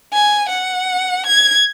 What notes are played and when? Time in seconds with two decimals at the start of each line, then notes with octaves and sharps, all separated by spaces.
0.13 G#5
0.49 F#5
1.26 G#6